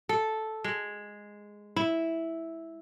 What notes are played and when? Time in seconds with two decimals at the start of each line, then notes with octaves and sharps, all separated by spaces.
0.09 A4
0.64 G#3
1.76 E4